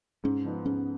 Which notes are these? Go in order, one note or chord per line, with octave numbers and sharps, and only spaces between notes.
G#2 C#4
F3 B3 D#4
G#2 C#4